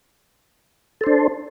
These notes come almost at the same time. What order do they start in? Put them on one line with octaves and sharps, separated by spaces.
A4 C5 D4